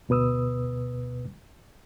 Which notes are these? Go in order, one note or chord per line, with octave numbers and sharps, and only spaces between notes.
D2 B2 B4 D#6 E6